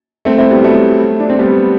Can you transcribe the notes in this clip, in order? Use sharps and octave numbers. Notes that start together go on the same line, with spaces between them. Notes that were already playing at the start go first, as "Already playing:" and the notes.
A3 C4
C4 E4
G3 B3
F#3 A3
D4
C4
G3 B3